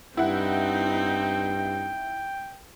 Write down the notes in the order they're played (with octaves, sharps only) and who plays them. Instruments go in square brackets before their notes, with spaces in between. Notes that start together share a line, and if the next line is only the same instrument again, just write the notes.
[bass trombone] G2 [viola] C4 D#4 [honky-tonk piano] E4 F#5 [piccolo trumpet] G5